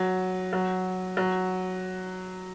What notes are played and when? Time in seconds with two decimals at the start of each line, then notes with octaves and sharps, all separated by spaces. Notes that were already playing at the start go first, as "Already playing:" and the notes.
Already playing: F#3
0.53 F#3
1.17 F#3